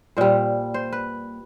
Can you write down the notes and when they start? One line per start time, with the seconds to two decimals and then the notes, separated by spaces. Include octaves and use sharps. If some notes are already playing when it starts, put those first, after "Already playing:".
0.17 A#2 G3 C5
0.74 C5
0.93 B4